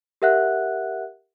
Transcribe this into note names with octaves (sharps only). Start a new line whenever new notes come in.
G4 A#4 E5 F#5 F#6